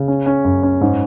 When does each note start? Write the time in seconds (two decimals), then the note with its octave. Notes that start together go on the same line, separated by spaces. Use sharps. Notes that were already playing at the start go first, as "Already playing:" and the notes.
Already playing: C#3
0.08 C#4
0.26 C#4
0.44 F#2
0.63 C#4
0.81 G#2